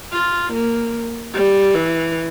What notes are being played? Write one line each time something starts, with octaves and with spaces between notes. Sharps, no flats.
F4
A#3
G3
E3